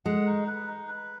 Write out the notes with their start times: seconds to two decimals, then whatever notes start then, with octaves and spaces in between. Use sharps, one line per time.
0.05 G#3 F#5
0.26 D#4
0.47 B4
0.67 D#4
0.88 B4